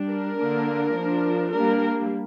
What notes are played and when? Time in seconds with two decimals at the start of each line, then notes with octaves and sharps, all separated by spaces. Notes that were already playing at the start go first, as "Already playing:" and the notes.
Already playing: G3 D4
0.10 A#4
0.38 D3 A#3 D4
0.96 F3 D4
1.53 G3 A#3 D4 A#4